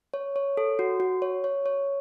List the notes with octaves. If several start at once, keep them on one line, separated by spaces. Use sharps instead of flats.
C#5
C#5
A4
F#4
F#4
C#5
C#5
C#5